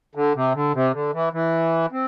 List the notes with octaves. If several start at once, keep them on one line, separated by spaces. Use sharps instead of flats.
D3
C3
D3
C3
D3
E3
E3
C4